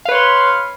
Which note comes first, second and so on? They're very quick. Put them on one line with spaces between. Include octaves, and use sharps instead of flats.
F5 B4 C#5 C6